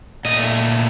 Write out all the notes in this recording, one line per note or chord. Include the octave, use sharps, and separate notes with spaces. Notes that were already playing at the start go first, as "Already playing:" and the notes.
A#2 A3 D#5